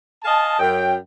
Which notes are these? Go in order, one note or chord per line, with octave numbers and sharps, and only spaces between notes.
D#5 F5 G#5 A5
F#2 G5